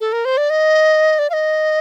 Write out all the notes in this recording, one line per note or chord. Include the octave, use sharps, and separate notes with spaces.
A4
A#4
C5
D5
D#5
D5
F5
D#5